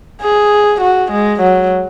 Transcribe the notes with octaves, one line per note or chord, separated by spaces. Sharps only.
G#4
F#4
G#3
F#3